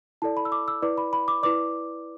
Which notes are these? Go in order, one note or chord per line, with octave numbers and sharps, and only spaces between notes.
E4 A4 D5 A5
B5
E6
D6
E6
E4 B4 D5 D6
B5
B5
D6
E4 B4 D5 D6